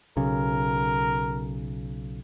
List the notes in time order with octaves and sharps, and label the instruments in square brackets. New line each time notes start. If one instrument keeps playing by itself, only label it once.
[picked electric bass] B1 C#3 [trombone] A#4